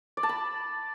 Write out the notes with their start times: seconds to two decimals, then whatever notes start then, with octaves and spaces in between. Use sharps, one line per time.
0.17 D5
0.23 A5
0.29 B5